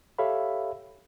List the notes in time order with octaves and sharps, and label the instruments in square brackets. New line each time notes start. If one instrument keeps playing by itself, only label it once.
[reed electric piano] G4 A4 C#5 E5 F5 B5